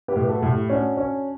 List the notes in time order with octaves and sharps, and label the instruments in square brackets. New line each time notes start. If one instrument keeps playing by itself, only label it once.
[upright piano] G4 B4
[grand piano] A2
[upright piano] B4
F#4 A4
[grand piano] A2
[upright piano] E4 G4
[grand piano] C#4 [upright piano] D4 F#4
[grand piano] C#4